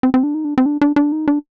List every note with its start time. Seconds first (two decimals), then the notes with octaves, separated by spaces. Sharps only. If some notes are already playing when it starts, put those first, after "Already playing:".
0.03 C4
0.14 C4
0.23 D4
0.34 D#4
0.45 D4
0.58 C4
0.66 D4
0.81 D4
0.96 D4
1.12 D#4
1.28 D4